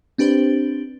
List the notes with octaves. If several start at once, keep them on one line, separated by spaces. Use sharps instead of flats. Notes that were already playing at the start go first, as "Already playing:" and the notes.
C4 D4 G4 B4 C5